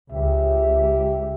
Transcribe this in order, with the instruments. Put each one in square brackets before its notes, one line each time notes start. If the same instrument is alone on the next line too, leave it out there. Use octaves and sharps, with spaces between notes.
[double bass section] C#2 [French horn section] G4 [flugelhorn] E5